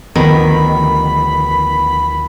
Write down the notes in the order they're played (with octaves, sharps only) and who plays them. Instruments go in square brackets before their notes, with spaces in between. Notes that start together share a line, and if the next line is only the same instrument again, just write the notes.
[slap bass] D2 D3 F3 [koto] D#3 [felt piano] B3 [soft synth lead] B5